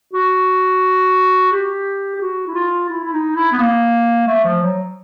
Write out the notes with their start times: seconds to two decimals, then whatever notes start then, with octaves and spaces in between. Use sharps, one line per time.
0.13 F#4
1.51 G4
2.15 G4
2.21 F#4
2.47 E4
2.54 F4
2.89 E4
3.03 E4
3.13 D#4
3.35 E4
3.52 B3
3.59 A#3
4.27 A3
4.44 F3
4.63 F#3